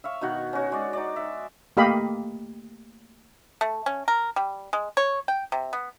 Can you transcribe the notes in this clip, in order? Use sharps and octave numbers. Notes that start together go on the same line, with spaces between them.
E5 F5 C#6
B2 D#3 F#4 F#5
C#4 F#4
G#3 D5
D#4 D5
E5
A3 A#3 G4 D#5 F5 B5
A3
C#4
A#4
G3
G#3
C#5
G5
C3
B3